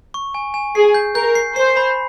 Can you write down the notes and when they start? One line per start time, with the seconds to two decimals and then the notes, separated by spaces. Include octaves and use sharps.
0.14 C#6
0.34 G#5
0.54 G#5
0.75 G#4 C7
0.94 G6
1.15 A#4 G6
1.35 C7
1.56 C5 C7
1.77 B5